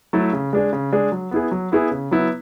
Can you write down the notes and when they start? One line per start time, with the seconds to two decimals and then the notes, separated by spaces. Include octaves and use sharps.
0.13 F#3 A3 E4 A4
0.33 C#3
0.53 G#3 D4 G#4
0.73 C#3
0.92 G#3 D4 G#4
1.12 F#3
1.31 B3 E4 G#4
1.51 F#3
1.72 B3 E4 G#4
1.91 C#3
2.11 F#3 B3 E4